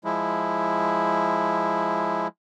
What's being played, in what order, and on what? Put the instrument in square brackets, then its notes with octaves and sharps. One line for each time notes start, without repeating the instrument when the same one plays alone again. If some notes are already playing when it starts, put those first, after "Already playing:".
[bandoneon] F3 G#3 E4